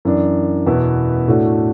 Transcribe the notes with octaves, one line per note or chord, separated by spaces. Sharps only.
F#2 E3 D4
E2 B2 B3 E4
A2 A3 D4 F#4